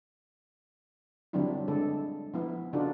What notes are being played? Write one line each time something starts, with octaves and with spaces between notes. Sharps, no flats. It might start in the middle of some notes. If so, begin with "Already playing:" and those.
D3 F#3 G3 C4 D4 E4
D3 G#3 A4
F3 B3 E4
C#3 D4 D#4 F4 F#4 A4